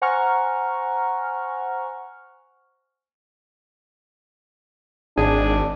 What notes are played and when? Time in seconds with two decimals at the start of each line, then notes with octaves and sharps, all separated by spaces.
0.02 C5 F#5 G#5 A#5 C#6 F6
5.17 G#1 D4 G#4